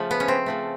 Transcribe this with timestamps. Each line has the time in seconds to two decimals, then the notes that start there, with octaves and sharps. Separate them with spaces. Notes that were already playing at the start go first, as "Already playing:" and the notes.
Already playing: C#3 F3 A3
0.11 B3
0.20 C#4
0.28 C4
0.46 C#3 F3 A3